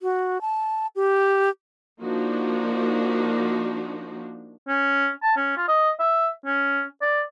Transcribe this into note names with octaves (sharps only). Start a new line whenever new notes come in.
F#4
A5
G4
F3 A#3 D4 D#4 F#4
C#4
A5
C#4
F4
D#5
E5
C#4
D5